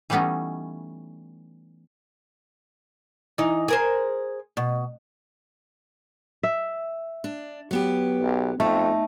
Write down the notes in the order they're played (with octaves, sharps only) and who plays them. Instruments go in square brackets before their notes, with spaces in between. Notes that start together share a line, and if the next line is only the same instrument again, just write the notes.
[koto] E3 G3 A3 B3 C#4 D#4
[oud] E3 D#4
G#4 A#4 C5
B2
[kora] E5
[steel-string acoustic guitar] D4
F#3 B3 G4
[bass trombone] B1
[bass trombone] F2 [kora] A3 [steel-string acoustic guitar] D#4